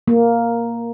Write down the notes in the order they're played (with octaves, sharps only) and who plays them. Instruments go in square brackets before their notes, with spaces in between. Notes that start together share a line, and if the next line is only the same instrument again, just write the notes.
[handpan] A#3